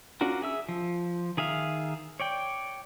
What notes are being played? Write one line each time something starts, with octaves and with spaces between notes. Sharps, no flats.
C#4 D4 F4 F#4 A#4
G#4 E5 E6
F3
D#3 G#4 E5 F5
C#5 D5 G5